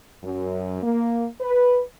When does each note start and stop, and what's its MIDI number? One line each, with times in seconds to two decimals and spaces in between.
0.23 0.78 42
0.82 1.25 58
1.40 1.80 71